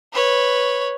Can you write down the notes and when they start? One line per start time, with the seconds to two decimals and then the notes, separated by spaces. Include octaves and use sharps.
0.13 B4 C#5